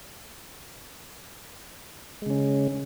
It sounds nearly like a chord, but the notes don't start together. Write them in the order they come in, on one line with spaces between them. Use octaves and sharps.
G#3 C#3 C#4